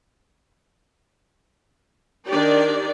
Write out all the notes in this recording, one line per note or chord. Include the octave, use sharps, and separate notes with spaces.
D#3 D4 G4 D5